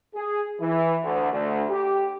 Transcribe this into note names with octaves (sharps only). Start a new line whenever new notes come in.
G#4
E3
D2
D2
G4